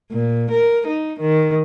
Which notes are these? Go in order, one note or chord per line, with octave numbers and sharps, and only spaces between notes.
A#2
A#4
D#4
D#3